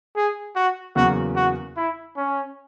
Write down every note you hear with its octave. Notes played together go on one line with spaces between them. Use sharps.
G#4
F#4
E2 C#3 F#3 A#3 F#4
F#4
E4
C#4